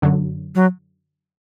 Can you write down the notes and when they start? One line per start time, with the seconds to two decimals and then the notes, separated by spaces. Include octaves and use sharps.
0.02 F#2 D3 F#3
0.55 F#3